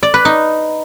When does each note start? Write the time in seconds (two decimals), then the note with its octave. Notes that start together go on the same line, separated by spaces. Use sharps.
0.03 D5
0.14 B4
0.25 D#4